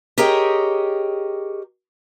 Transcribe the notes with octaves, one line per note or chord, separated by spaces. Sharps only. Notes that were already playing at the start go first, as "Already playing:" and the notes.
G4 G#4 A#4 C#5 D#5 G5